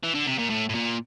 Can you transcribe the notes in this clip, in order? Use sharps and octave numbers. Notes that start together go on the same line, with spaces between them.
E3
D3
C3
A#2
A2
A2
A#2